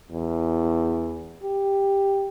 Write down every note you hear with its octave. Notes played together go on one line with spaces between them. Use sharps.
E2
G4